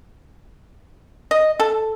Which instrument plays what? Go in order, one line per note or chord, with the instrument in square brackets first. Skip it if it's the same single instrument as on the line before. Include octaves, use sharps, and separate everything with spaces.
[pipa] D#5
A4